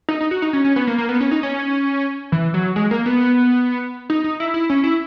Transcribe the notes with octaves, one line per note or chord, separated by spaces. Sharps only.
D#4
D#4
F#4
D#4
C#4
C#4
B3
A#3
A#3
B3
C#4
D#4
C#4
E3
F#3
G#3
A#3
B3
D#4
D#4
E4
E4
C#4
E4